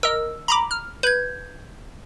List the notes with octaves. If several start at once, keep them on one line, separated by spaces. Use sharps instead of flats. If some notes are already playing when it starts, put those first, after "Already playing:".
A#4 D#5 E6
A#5 B5 D6
F6
B4 G6 G#6